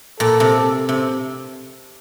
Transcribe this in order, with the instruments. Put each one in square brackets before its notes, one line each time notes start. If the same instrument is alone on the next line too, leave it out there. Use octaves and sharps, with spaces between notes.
[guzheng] A#2 [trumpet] A4
[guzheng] C3
C3